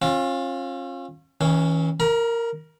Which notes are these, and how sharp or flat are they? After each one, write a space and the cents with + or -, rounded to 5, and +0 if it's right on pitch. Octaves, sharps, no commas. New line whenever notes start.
C#4 -40 F4 +15
E3 -35 C#4 +0
A#4 -10 A#5 +40